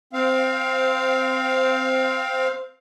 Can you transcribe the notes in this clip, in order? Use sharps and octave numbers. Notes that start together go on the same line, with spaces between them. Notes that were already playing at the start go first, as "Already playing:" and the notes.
C4 F5